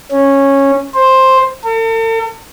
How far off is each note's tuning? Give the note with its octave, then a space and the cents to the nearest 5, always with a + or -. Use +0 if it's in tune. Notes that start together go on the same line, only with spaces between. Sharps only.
C#4 -10
C5 +5
A4 +45